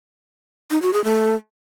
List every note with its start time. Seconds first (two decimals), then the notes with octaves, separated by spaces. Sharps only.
0.71 D#4
0.82 F#4
0.93 G#4
1.04 A3